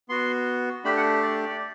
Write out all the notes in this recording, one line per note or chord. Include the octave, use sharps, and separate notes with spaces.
B3 F#4 C6
A3 D4 G4 B5
F#5
D5